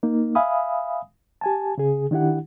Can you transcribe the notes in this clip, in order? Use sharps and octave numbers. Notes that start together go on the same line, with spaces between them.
A#3 D#4
E5 F5 G#5 B5 D#6
G4 G#5 A5
C#3 G#4
D#3 D4 E4 G4 F#5